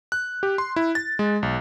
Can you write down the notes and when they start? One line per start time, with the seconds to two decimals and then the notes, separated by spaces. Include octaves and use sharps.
0.12 F#6
0.43 G4
0.58 C6
0.76 E4
0.95 A6
1.19 G#3
1.43 B1